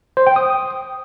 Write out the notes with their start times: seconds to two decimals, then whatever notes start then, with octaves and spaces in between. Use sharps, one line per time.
0.17 C5
0.27 G5
0.36 D#6